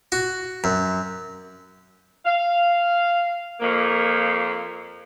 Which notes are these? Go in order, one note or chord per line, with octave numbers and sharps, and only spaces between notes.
F#4
F#2
F5
F2 A#3